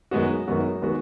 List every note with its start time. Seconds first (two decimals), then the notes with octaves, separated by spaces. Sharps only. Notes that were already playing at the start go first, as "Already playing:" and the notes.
0.11 F#2 D#3 G#3 B3 F#4
0.47 F#2 D#3 G#3 B3 F#4
0.82 D#3 G#3 B3 F#4